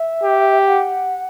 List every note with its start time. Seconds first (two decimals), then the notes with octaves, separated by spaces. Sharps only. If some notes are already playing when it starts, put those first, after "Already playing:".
Already playing: E5
0.23 G4
0.67 F#5